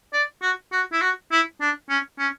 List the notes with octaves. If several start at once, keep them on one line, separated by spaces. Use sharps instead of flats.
D5
F#4
F#4
E4
F#4
E4
D4
C#4
C#4